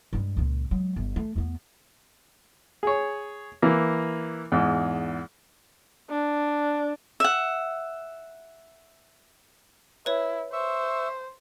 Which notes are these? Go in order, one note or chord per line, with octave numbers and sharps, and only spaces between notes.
G2 G#3
C#2 A#2
F#3 G#3
G1
A3
E2 B3
G#4 C#5
E3 A#3
E2 G#2
D4
E5 F#5
E4 B4 C#5
C5 E5 C#6